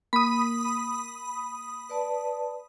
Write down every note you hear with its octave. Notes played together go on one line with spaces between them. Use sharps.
A#3 B5 D#6
B4 D5 A5